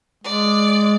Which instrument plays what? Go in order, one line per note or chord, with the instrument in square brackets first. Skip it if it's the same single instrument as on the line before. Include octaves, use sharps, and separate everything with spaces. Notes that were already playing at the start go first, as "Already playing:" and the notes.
[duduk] G#3 [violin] D5